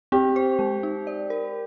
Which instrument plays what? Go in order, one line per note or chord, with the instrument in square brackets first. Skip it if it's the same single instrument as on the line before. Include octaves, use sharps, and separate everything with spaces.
[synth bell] C4 [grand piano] G4
[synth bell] C5
G#3
D#4
D5
A#4